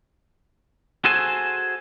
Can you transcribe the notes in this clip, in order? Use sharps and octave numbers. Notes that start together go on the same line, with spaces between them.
F#4 G#4 A4 C5 G#5